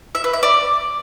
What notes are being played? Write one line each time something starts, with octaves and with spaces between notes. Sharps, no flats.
E5
B4
E5
D5